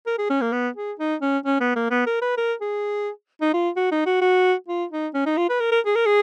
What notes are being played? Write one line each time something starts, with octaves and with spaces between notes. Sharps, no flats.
A#4
G#4
C#4
A#3
B3
G#4
D#4
C#4
C#4
B3
A#3
B3
A#4
B4
A#4
G#4
D#4
F4
F#4
D#4
F#4
F#4
F4
D#4
C#4
D#4
F4
B4
A#4
A#4
G#4
A#4
G#4